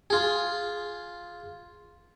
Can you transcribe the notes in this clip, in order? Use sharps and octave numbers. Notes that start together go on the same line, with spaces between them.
F4 G#4